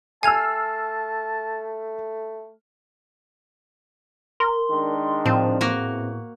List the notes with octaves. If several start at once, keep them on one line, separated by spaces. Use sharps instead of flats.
A3 G#5 A5 E6 F6 G#6 C7 F7
A#4 C6
D#3 G#3 D4
A2 F3 C4
E2 A#3 F#4 A#4